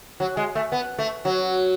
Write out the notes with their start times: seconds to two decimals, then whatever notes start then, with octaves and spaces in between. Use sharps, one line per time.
0.20 F#3
0.37 G#3
0.55 A3
0.72 B3
0.99 A3
1.25 F#3